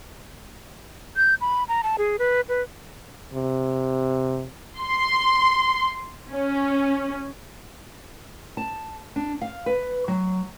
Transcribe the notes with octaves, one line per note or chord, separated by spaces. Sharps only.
G6
B5
A#5
A5
G#4
B4
B4
C3
C6
C#4
A5
D4
F5
B4
F#3